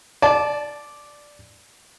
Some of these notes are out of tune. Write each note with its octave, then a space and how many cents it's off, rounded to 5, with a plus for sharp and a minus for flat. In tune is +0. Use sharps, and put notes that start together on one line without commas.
D5 +0 A5 -25